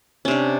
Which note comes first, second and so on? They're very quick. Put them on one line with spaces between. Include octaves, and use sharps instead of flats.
C#4 C3 D4